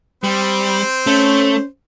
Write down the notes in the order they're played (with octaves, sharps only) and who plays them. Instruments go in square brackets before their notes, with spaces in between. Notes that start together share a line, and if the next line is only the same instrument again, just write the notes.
[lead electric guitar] G3 [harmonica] C4 C5
[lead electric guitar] A3 [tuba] C#4